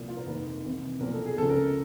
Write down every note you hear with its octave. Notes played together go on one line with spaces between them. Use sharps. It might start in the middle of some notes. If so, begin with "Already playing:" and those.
Already playing: C2 A#2 F3
F4
A#4
F1 D#2 D#3 B4
C2 C3 E3
B1 A#2 F3 A#4
A4
G#4
C#2 C#3 F3 A4
A#4